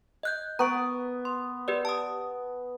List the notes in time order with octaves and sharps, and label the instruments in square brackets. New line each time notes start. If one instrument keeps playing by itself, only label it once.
[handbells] D#5 F#6 G6
[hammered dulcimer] B3 [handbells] A#5 C#6 D7
[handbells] C6
G4 B4 D5
A5 D#6